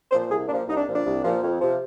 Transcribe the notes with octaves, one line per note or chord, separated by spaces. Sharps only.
A#2 F3 C5
C2 G#4
A#2 D4
F3
C2 D#4
D4
A#2 F3
D4
C2
A#2 F3
F2
C3 F3